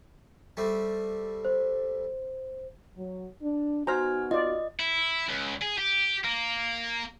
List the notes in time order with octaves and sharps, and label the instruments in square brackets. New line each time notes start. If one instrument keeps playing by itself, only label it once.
[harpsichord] G3 A3 C4
[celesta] C5
[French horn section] F#3
D4
[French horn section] B3 D#4 F#4 [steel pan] C5 A#5 [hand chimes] G#5 F6 G#6
[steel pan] F4 D5 [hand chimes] D#5
[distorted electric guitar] E4
C#2
G#4
G4
A#3